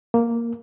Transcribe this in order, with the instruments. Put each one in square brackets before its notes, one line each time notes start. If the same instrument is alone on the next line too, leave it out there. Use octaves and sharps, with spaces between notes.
[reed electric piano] A#3